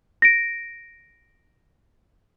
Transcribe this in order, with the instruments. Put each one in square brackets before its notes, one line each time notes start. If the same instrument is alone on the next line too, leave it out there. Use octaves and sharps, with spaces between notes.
[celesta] A#6 D7